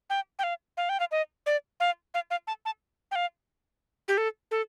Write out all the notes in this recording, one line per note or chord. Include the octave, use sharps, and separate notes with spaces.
G5
G5
F5
F5
G5
F5
D#5
D5
F5
F5
F5
A5
A5
G5
F5
G4
A4
A4